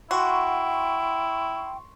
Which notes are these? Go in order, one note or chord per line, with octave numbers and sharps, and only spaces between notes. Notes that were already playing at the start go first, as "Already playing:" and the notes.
E4 F#4 G5 C6 C#6